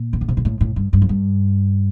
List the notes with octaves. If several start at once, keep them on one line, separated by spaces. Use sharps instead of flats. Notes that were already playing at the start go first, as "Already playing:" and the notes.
Already playing: A#2
D#3
D3
C3
A#2
A2
A2
G2
G2
F2
G2